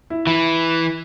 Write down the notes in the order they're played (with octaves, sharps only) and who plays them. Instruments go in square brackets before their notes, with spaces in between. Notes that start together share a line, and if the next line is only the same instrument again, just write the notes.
[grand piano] E4
[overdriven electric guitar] E3 [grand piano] E4